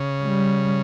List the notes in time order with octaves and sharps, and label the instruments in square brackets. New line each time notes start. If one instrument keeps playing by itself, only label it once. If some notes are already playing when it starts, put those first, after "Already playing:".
Already playing: [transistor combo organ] C#3
[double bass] G3